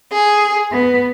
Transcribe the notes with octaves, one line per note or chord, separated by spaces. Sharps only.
G#4
B3